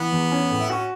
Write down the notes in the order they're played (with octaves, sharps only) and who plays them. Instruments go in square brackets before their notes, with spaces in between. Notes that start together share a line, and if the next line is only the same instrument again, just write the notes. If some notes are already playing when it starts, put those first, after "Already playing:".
Already playing: [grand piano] E3 [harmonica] B3
[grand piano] E2
C#4
A2
[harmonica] E4
[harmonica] C#4 [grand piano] F#4